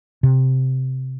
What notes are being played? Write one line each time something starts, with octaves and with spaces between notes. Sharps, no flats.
C3